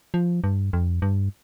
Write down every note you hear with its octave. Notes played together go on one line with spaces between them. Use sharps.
F3
G2
F2
G2